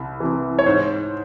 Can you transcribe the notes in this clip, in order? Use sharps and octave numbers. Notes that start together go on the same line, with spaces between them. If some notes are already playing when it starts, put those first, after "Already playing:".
Already playing: C2
C3 E3
C#5
G#2 C5